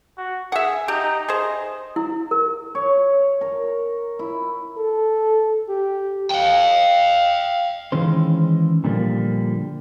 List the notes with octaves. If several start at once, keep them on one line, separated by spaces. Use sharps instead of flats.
F#4
G#4 E5 F#5
D#4 G4
G#4 C5 D#5
E4
A#4
C#5
A#4
E4
A4
G4
F5 G5
D#3 E3 G#3 C#4 C5
A#2 D3 F3 G3 G#3 A#3